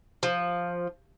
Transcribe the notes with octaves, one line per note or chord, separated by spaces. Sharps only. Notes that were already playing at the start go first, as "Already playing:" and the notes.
F3